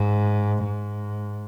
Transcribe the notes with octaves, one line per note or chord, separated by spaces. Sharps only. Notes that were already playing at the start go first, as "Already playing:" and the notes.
Already playing: G#2
G#2